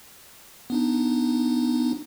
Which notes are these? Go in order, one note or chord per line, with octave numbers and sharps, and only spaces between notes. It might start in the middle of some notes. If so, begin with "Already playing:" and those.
B3 D4 D#4